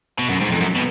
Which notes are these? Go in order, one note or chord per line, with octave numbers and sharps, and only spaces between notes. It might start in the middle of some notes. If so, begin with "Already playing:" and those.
B2
F#2
G#2
F2
F#2
B2